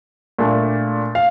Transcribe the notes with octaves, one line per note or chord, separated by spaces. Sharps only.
A#2 A3 D4
F5